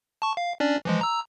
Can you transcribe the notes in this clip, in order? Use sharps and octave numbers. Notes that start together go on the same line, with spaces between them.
A5 C#6
F5
C#4 D4 D5
E3 F3 G#3
A#5 E6